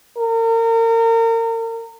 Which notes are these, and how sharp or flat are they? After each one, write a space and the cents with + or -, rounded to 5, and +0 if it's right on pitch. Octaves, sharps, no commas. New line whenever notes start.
A#4 -35